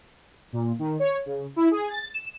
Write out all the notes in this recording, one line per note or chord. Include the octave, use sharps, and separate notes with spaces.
A#2
D#3
C#5
C#3
E4
G#4
A6
E7